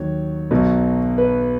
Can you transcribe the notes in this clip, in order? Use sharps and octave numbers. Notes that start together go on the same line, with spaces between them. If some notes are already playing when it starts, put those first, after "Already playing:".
Already playing: D#2 D#3 F#3 C#5
B1 B2 F#3
B4